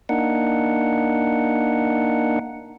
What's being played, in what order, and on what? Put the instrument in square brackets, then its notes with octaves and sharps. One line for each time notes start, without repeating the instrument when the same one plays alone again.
[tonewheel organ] A#3 D4 D#4 F#5